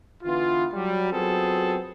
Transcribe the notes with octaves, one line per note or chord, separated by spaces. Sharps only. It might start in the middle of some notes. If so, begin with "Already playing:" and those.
D3 E3 B3 F4
F#3 G3
F#3 B3 C4 F4 G#4 A4